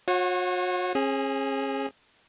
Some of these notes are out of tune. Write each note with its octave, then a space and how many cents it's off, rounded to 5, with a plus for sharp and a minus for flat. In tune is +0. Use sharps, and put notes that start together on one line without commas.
F#4 -45 C#5 -30 F#5 +0
C#4 -40 G#4 +0